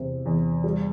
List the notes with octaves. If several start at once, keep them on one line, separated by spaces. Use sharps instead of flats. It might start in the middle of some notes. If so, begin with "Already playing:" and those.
Already playing: E2 C3
E2
G3